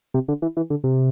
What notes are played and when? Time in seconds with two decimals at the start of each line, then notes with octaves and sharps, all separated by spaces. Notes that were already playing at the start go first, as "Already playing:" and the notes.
0.14 C3
0.28 D3
0.42 E3
0.57 E3
0.70 D3
0.84 C3